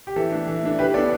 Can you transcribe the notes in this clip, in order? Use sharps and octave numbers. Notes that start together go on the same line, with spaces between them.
G4
E3 A4
A3 D4
E3
A3 D4
E3 G4 B4
B3 D4 A4 D5